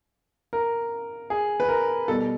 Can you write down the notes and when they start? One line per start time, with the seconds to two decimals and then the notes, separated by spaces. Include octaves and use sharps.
0.53 A#4
1.30 G#4
1.60 B4
1.69 A#4
2.08 B2 G3 A4